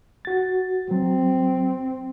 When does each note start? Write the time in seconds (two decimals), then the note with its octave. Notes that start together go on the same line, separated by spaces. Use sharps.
0.25 F#4 A6
0.91 F#3 C4